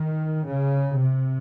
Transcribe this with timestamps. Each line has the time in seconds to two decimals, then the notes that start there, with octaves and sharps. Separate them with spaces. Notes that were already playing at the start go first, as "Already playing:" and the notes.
Already playing: D#3
0.46 C#3
0.97 C3